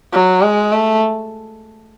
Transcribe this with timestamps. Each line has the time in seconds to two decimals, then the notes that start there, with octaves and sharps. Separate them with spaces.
0.13 F#3
0.42 G#3
0.72 A3